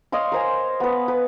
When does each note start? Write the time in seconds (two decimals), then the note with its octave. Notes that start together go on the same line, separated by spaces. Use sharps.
0.12 C#5 D#5 F5 C6
0.32 A#4 C5 G#5
0.80 B3 B4
1.08 B4